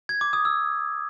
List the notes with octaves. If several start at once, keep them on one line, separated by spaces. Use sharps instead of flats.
G#6
D6
D#6
E6